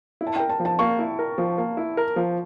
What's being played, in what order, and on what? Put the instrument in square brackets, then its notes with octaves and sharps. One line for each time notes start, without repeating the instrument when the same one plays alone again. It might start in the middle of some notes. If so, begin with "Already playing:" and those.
[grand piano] E4
[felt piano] A5
[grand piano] A#4 [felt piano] G5
[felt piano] A5
[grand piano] F3
[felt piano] A5
[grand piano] A#3 [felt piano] C#6
[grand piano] E4
A#4
F3
A#3
E4
A#4
F3